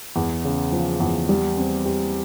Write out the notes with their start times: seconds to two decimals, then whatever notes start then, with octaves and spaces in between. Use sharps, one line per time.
0.16 E2
0.45 C#3
0.72 F3
1.00 E2
1.29 G3
1.57 C4
1.86 G4